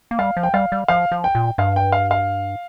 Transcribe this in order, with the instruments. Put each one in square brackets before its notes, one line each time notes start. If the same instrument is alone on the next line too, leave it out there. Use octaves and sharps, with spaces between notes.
[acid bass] A#3
[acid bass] G3 [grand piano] F5
[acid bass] F3
[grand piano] G5
[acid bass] G3 [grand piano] F5
[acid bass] G3
[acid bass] F3 [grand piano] F5
[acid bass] F3
[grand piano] G5
[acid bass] A#2
[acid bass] G2 [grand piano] F5
[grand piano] G5
F5
F5